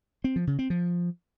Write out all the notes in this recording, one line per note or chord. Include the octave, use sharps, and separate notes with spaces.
C4
F3
C#3
C4
F3